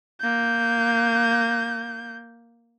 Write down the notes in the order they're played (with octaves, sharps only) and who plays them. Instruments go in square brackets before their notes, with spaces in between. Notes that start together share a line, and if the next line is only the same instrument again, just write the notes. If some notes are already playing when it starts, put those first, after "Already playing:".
[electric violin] A#3 G6